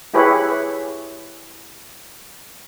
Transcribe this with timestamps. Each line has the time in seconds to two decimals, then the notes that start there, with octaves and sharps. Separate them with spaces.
0.14 E4 G4 G#4 B4 C#5 E5